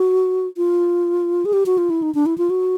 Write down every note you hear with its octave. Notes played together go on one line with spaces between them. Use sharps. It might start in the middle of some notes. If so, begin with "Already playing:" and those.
Already playing: F#4
F4
G#4
G4
F#4
F4
E4
D#4
D4
E4
F4
F#4